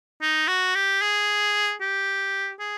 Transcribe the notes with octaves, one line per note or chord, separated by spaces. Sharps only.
D#4
F#4
G4
G#4
G4
G#4